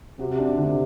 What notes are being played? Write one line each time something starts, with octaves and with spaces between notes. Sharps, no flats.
C3 F#4
D4
D3